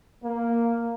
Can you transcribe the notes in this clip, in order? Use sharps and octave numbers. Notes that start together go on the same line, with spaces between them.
A#3